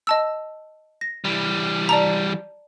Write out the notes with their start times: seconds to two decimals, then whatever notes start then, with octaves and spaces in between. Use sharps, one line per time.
0.07 D#5 A5 E6
1.01 A#6
1.24 E3 G3
1.89 D5 A5 A#5